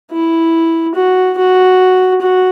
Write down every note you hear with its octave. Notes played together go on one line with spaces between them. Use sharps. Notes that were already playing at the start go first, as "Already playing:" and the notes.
E4
F#4
F#4
F#4